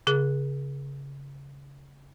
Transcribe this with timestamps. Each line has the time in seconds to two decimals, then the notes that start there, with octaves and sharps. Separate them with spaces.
0.07 C#3 G#4